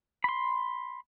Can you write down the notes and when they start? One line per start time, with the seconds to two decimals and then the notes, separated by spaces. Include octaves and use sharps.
0.24 B5 C6